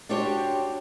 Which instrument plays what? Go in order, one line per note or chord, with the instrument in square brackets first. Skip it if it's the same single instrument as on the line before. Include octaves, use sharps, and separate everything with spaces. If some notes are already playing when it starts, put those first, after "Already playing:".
[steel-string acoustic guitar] D4 F#4 G4 C5 C#5